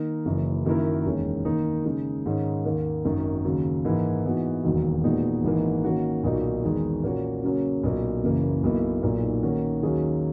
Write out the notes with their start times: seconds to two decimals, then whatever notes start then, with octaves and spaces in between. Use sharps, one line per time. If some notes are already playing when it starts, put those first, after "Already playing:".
Already playing: D#3 A#3 D#4 A#4
0.25 F#1 F#2 C#3 E3
0.65 F#2 D#3 A#3 E4 A#4
1.05 E1 D#2 D#3 G#3 C#4
1.45 D#3 A#3 D#4
1.85 C#3 G#3 D#4
2.26 G#2 D#3 G#3 C#4
2.65 D#2 D#3 A#3
3.05 G#1 F#2 D#3
3.45 D#2 C#3 F#3
3.85 G#2 E3 A#3 E4
4.24 G#2 E3 B3 F#4
4.64 E1 D#2 D#3 F#3
5.04 A#2 G#3 B3 D#4 F#4
5.44 G#1 G#2 E3 A#3
5.84 D#3 A#3 C#4 F#4
6.24 B1 A#2 A#3 D#4 F#4
6.63 E2 D#3 G#3 D#4
7.03 A#2 A#3 C#4 F#4 C#5
7.44 C#3 F#3 A#3 C#4
7.83 B1 A#2 F#3 A#3
8.23 F#1 F#2 C#3 E3 A#3
8.64 B1 B2 A#3 E4
9.03 B1 A#2 A#3 D#4
9.43 D#3 A#3 C#4 F#4
9.83 D#2 D#3 F#3 C#4 G#4